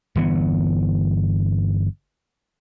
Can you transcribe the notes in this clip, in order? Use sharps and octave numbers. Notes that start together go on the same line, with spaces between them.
G1 E3 B3